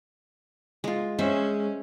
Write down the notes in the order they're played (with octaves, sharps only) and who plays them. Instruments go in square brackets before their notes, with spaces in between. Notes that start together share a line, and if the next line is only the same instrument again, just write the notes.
[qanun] G#3 F4
[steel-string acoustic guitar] G#3 [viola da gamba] C#4 [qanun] C5 E5